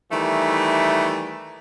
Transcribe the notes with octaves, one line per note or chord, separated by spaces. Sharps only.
D#3 E3 G3 A3